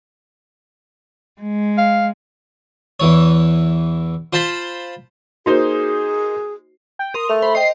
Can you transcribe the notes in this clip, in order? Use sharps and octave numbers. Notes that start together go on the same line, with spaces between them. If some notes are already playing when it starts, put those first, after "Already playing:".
G#3
F5
E2 E3 C#5
F4 C5 A5 B5 C6
A#3 D#4 F#4 G#4 C5
G5
A#4 C6 D#6
A3 F7
C5 B5
D#5 G5 C7